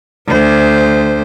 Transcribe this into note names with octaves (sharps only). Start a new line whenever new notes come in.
D2 C5